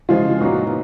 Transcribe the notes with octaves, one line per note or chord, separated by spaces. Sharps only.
C#3 F3 G#3 F4
A#2 F#3 B3 D#4 F#4